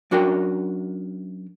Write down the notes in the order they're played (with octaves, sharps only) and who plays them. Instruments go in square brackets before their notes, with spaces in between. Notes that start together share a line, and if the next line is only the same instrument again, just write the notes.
[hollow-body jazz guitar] F#2 D4 F#4 A#4 G5